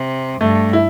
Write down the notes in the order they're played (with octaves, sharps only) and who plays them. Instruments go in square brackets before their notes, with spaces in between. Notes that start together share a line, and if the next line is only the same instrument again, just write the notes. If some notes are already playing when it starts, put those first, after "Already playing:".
Already playing: [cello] C3
[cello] G2 [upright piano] A3
[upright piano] E4